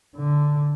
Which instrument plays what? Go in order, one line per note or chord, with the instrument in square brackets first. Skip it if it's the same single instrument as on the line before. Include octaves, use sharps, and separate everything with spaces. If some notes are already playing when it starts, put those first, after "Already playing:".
[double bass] D3